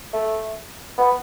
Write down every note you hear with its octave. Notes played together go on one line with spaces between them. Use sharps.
A3
B3